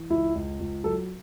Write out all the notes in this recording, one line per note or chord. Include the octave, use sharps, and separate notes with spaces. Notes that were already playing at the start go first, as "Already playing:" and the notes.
Already playing: E3
C#2 E4
C#2
C#2
F#3 A4